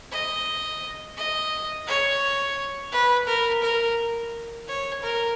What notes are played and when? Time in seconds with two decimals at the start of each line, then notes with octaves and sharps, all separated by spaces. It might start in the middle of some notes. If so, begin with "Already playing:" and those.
0.12 D#5
1.17 D#5
1.87 C#5
2.92 B4
3.27 A#4
3.62 A#4
4.68 C#5
5.03 A#4